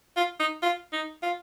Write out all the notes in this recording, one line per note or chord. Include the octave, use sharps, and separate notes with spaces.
F4
D#4
F4
D#4
F4